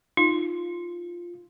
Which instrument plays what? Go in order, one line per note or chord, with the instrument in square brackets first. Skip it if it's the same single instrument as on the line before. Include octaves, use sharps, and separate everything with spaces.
[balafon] D#4 [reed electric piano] F4